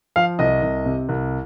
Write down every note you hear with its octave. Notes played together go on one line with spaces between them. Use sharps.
F3 F5
C2 D#5
C2
C3
C2